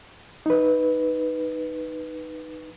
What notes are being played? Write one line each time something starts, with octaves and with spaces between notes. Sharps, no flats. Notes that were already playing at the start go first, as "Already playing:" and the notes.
D#4 B4